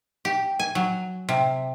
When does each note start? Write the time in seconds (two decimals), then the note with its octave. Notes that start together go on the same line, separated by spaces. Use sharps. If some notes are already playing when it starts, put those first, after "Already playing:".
0.25 G4
0.59 G#5
0.75 F#3
1.29 C3